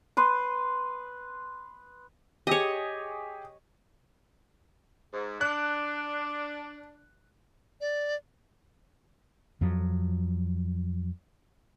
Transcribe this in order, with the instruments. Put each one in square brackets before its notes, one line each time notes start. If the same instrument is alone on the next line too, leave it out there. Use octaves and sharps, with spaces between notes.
[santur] B4 C6 D#6
[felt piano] G4 G#4 [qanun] C#5 D#5
[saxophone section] G#2
[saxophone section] D4 [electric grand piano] F#6
[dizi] D5
[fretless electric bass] F2 F3 F#3